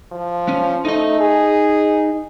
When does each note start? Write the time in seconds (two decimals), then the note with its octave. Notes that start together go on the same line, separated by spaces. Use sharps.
0.12 F3
0.49 C#4
0.85 A3 D#4 D#5
1.20 G#4